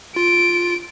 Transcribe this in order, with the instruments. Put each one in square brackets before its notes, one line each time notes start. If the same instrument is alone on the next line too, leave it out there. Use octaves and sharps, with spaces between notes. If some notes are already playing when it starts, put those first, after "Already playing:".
[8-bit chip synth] F4 [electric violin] D7